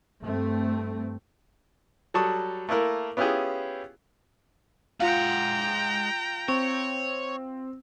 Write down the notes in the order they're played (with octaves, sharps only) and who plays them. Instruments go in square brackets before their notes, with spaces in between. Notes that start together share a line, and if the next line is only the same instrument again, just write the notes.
[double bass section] G2 A3 C4
[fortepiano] F#3 G3 A4 A5 C#6 D#6
A3 A#3 E4 A#4
B3 C#4 E4 F4 G4 G#4
[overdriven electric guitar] G#3 F#5 [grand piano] F4 [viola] G5 A#5
[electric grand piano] C4 [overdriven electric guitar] C#5